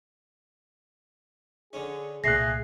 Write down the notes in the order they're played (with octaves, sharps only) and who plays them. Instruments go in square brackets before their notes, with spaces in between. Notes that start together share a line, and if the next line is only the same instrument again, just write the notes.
[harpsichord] D3 C#4 [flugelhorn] G#4
[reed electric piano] C2 A#2 F#6 [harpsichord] A3 A#3 [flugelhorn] G#4 [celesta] A#6 C7